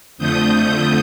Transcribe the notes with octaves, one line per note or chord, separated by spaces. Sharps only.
F2 D3 F3 A3 D#6 G6